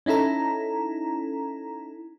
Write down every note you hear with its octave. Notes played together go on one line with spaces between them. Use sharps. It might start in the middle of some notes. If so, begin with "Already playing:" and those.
C#4 D#4 E4 A4 A#5